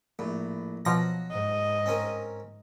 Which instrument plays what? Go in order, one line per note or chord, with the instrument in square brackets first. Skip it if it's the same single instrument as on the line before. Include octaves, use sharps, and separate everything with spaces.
[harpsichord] A#1 A2
[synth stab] B2 F3 A#6 [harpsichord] F#3
[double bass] G#2 [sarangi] D#5
[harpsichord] C4 C#4 A#4